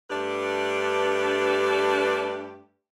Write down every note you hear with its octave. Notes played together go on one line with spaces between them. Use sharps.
G2 A3 D4 G4 B4